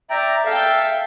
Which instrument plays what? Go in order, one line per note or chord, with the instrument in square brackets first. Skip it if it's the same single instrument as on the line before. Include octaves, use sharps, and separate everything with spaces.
[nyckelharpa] D5 [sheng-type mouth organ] E5 G5 A#5
[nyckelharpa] A4 G5 [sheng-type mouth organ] E5 F5